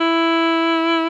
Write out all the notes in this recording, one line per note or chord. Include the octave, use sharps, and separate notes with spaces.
E4